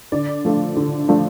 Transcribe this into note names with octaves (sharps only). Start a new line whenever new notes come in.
D3 D5
F3 A3 D4 F4
D3
F3 A3 D4 F4